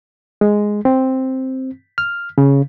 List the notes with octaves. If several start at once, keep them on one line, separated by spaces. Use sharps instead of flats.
G#3
C4
F6
C#3